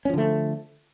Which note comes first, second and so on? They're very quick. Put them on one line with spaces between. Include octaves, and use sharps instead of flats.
C#4 F3 D3 A3